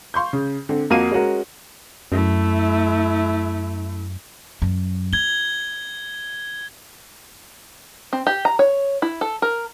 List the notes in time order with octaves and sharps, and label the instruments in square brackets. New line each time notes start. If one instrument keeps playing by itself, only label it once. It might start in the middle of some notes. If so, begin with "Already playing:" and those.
[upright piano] F5 C6 C#6 G6
C#3
D3 C4
F2 A#3 F#4 F5 D#7
G#3 C#4 F#4 A#4
[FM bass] F#2 [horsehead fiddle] A3 E4
[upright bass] F#2
[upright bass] E4 [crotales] G#6 G7
[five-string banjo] C4
G4
A#5
C#5
E4
A4
A#4